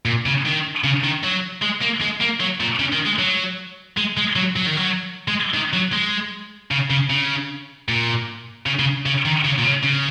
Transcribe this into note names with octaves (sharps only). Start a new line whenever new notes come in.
A#2
C#3
D#3
C#3
D#3
F#3
G#3
A#3
G#3
A#3
F#3
A#2
C#3
D#3
G#3
F#3
G#3
G#3
F#3
F#3
D#3
F#3
G#3
D#3
F#3
G#3
C#3
C#3
C#3
A#2
C#3
C#3
C#3
D#3
C#3
A#2
C#3
C#3